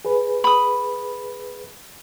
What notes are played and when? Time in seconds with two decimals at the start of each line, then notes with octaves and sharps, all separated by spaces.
0.05 G#4 B4
0.44 B5 D#6